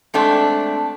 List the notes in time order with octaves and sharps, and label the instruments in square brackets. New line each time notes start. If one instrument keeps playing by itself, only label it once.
[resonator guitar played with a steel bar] G#3 A3 C4 D4 A4